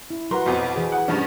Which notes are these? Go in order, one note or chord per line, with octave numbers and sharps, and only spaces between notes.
E4
F#3 A#4 B4 F#5 A#5 C6
B1 F2
E3 G#4
F#5
G2 F3 C#4 D4